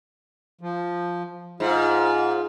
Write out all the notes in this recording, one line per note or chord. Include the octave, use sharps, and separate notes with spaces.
F3
G#2 F4